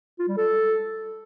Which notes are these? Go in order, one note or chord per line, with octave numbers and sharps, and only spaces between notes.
F4
G3
A4